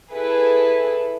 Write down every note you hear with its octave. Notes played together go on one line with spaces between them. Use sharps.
E4 G#4 A4 B4